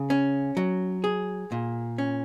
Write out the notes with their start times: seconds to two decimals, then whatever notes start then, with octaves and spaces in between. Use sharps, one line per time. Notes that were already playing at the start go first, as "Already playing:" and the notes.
Already playing: C#3
0.10 C#4
0.57 F#3
1.04 G#4
1.52 A#2
1.98 C#4